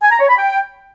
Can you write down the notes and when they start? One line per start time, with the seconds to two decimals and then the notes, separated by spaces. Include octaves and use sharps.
0.02 G#5
0.11 A#5
0.20 C#5
0.29 B5
0.38 G5